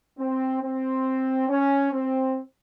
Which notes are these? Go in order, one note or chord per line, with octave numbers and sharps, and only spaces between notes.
C4
C4
C#4
C4